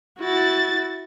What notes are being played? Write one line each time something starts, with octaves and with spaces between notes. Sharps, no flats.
E4 F#4 A6